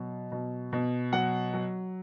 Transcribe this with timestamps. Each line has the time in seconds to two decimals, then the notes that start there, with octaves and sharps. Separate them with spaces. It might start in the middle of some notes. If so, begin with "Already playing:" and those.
Already playing: B2 F#3
0.32 B2
0.73 B2
1.12 F#3 F#5
1.53 F#3